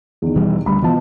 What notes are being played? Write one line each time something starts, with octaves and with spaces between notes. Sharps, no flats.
E2 D#3
B2 E3 G3
D2 G3 B5
B2 E3 F3 A5